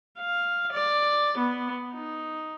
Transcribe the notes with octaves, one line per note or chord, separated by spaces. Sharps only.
F5
D5
B3
D#4